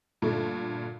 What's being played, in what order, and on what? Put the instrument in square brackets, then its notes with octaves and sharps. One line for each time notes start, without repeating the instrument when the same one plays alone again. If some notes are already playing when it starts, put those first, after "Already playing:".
[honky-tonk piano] G2 A#2 D3 A3